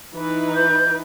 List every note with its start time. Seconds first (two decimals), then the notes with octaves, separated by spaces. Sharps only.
0.15 E3 D#4 B4
0.56 G6